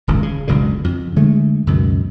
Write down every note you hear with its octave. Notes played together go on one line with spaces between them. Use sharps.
D#1 G#1 C#2 A#2
C#3
F#1 C#2 B2 D3
F2
D3 G#3 A3
C#2 F#2 B2 D#3